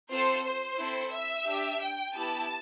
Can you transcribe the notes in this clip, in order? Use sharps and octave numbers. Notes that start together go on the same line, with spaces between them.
C4 F4 A4 C5
C5
C4 E4 A4
E5
D4 G4
G5
B3 E4 G4 A5